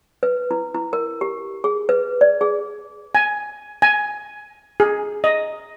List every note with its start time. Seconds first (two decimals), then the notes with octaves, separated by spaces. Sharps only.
0.23 B4
0.51 E4
0.74 E4
0.93 A#4
1.21 G4
1.64 G#4
1.89 B4
2.21 D5
2.41 G#4
3.15 G#5
3.82 G#5
4.80 G#4
5.24 D#5